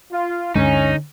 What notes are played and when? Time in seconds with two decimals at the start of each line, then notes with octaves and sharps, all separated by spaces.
0.12 F4
0.55 D2 G2 D3 G#3 C#4 D#4